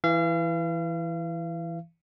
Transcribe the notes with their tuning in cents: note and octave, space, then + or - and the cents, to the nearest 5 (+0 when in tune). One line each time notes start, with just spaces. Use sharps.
E3 +5 F5 -35